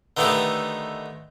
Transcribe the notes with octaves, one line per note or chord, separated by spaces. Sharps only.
D3 D#3 A3 B3 D#4 G4